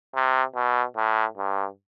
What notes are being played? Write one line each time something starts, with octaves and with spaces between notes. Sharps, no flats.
C3
B2
A2
G2